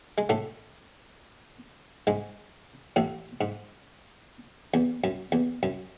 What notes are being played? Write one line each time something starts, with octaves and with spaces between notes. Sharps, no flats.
G#3
A2 A3
G#2 G#3
A1 A2
G#2
E2
F#2
E2
F#2